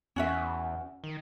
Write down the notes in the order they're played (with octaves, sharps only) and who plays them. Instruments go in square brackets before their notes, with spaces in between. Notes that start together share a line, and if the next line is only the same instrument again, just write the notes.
[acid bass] E2 [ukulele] C#4 F#4 E5
[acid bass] D#3